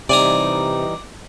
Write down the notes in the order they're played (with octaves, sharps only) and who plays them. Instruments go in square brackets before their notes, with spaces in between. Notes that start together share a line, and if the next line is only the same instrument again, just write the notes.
[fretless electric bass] C3 [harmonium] E3 G3 D#4 [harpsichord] D5 G#5 A#5 [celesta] D6